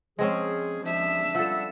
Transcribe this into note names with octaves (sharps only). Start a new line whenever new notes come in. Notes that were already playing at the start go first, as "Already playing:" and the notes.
F3 G#3 C4 C#4 G#4
F3 D4 E5
F3 G3 A4 F#5 E6